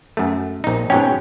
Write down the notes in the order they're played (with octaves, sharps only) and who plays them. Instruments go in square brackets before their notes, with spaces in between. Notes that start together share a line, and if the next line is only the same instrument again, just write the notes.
[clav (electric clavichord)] F#2 A3
A#1 D#4
[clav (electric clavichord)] G#2 B2 C#4 [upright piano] G5